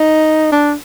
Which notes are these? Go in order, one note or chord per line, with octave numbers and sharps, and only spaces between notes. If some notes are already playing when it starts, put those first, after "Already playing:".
Already playing: D#4
D4